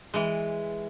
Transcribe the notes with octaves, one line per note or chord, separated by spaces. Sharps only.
E3 G#3